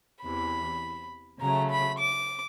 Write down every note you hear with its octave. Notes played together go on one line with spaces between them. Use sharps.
E2 C3 E3 B5
C#3 F#3 A3 A#5
B5
D6